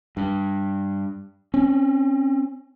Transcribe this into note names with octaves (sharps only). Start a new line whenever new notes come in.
G2
C4 C#4